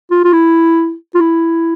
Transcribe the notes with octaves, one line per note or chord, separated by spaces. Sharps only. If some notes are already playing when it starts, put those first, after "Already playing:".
F4
F4
E4
F4
E4